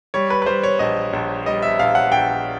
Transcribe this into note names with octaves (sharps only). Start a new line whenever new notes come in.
G3 C#5
B4
B4
G3 C5
C#5
A#1 D#5
A#1
G3 D#5
E5
A#1 F5
F#5
A#1 G5